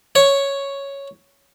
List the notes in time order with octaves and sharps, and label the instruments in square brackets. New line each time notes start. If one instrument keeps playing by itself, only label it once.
[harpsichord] C#5